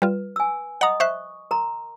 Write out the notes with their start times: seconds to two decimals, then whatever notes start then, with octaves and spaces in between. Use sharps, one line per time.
0.02 G3 F4 B4
0.36 G#5 E6
0.81 D#5 F#5 A#5 D#6
1.00 C5 E5 C#6 F#6
1.51 A#4 A#5 C6